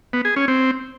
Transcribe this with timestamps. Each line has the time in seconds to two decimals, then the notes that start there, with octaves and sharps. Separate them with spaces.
0.13 B3
0.25 G#4
0.36 C#4
0.48 C4